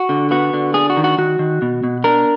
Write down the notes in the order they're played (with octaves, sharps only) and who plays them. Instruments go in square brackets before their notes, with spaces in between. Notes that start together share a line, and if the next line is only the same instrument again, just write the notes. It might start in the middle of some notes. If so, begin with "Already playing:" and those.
Already playing: [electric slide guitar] F#4
D3
B3 F#4
D3
D4 G#4
F#4
D#3
F#4
D#3 F#4
D#3
B2
B2
D4 A#4